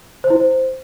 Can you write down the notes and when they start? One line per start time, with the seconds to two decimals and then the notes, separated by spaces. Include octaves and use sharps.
0.24 C5
0.30 E4
0.36 C5